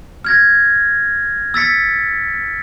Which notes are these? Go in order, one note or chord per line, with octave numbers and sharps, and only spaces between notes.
F6 G#6 A#6
E6 A6 B6 C#7